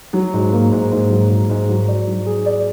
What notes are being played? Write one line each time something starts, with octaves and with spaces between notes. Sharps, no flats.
F#3
G#2
A#3
G#2
G#2
F#3
G#2
G#2
F#3
D5
F#3
G#4
D5